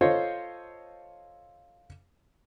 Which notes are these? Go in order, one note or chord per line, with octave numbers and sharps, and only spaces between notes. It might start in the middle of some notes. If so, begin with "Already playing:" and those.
F4 A4 C5 C#5 D#5